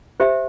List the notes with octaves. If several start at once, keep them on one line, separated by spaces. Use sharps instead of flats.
G4 C5 E5